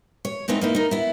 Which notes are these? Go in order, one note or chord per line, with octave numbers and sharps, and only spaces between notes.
C#5
D#3 G#3 B3 C4 D#4 E4
A#3 D#4 E4
D#4 A#4
B3 E4